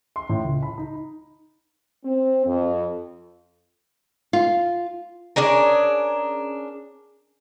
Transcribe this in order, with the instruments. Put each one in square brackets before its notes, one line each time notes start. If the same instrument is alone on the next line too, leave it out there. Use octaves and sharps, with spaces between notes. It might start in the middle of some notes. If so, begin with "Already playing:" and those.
[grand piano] C6
A2
C#2
B5
D#4
[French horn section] C4
F2
[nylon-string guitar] F4
[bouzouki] C#4 D4 G#4 A#4